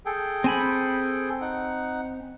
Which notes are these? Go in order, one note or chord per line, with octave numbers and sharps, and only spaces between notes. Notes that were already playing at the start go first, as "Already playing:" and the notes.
G#4 A4 G5
C4 G#5 B5
D#4 F#5